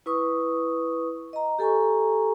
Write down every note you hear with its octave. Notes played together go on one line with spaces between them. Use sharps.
E4 B4 C#6 D#6
D#5 A#5
G4 A4 G#5 A#5 C#6